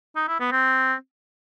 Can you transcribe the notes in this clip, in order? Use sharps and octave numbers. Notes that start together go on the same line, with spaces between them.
D#4
E4
B3
C4